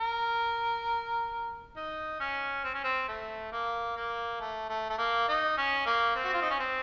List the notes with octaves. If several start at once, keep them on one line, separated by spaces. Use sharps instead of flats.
A#4
D#4
C#4
C4
C#4
C4
A3
A#3
A#3
A3
A3
A3
A#3
D#4
C#4
A#3
C4
F#4
F4
D#4
C#4
C4